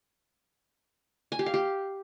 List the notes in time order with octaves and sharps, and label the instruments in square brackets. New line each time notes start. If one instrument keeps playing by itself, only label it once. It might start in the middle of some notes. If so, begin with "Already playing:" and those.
[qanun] G#5
G4
F5
G4